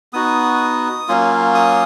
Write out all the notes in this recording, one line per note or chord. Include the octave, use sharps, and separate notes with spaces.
B3 D#4 F#4 D#6
F#3 A#3 C#4 F4
D#6